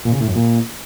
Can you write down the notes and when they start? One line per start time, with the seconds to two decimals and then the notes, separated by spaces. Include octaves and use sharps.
0.05 A#2
0.13 C#3
0.20 A2
0.28 F#2
0.35 A#2